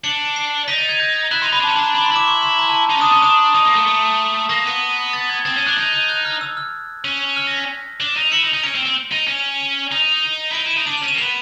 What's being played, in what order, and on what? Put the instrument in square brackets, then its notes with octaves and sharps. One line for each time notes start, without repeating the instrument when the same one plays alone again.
[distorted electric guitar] D4 [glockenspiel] C#7
[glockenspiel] D7
C7
[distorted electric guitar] D#4 [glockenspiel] B6
[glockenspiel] A6
G#6
G6
[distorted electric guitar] E4 [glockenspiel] F#6
[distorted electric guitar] D#4 [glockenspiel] C6
[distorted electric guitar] D#4 [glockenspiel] B5
[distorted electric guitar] D4
[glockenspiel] A5
[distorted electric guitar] C#4
[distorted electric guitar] D4 [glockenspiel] A#5
[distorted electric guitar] D4 [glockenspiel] B5
[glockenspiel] C6
[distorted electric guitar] E4
[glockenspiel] D6
C#6
C6
A#5
A5
[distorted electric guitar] D#4 [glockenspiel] A5
[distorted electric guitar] C#4
[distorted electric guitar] D4 [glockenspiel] D#6
[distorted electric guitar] C#4 [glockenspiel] C#6
[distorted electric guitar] D4 [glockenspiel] D#6
[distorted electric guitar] D#4 [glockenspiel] D#6
[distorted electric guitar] A#3
A3
A3
[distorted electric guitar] A#3 [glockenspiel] A#6
[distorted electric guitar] B3
[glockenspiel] A6
G#6
[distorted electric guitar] C4 [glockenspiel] A6
[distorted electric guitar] C#4 [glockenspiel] G#6
[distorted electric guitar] D4 [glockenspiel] F#6
[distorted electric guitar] D#4 [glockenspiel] G6
[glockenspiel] G6
F#6
F6
E6
F6
[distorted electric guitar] C#4
[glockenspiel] F6
A#6
B6
[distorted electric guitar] D4
D#4
[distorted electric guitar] E4 [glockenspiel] C#7
[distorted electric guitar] D#4
D#4
[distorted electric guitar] C#4 [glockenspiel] D7
[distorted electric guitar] C4
C4
D#4
C#4
[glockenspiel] D#7
[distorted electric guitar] D#4
[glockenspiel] D#7
[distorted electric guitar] E4
[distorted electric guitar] D#4 [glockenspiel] D7
[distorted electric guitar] E4
[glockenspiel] D#7
[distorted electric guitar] D#4
[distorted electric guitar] D4 [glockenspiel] D#7
[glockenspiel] F7
[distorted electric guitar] C#4
[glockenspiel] E7
[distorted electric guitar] A#3
[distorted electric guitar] B3 [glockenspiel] F7